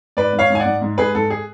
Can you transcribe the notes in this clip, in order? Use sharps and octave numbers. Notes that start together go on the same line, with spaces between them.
G#2 B4 D5
G#2
C#5 F5
G#2
G#5
D5 F#5
G#2
G#2
G#2 G#4 B4
G#2 A4
G#4